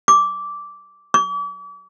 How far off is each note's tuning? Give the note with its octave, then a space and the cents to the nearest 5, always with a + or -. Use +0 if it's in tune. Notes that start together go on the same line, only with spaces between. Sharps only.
D6 -10
D6 -40